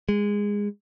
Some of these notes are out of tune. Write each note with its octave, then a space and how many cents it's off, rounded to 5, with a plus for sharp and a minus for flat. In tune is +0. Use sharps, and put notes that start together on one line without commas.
G#3 -15